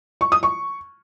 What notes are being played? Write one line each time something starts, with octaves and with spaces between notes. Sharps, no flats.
C#6
D#6
C#6